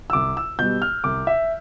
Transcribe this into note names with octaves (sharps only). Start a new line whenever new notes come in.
E6
C2 D6
E6
B2 G3 G6
F6
C2 D6
E5